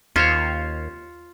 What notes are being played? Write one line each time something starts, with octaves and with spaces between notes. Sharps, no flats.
D#2 C#4 F4 C5 C#5